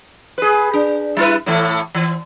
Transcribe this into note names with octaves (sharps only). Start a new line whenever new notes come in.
G#4 B4
D4
G3 E4 B4
A2 E3 A3
E3